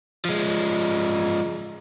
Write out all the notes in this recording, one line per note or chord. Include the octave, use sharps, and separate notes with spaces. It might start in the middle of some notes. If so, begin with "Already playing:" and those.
F3 G#3